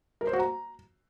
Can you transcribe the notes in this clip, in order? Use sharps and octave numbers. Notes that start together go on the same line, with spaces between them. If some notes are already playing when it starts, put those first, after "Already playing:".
A#4
C5
F#4
A#5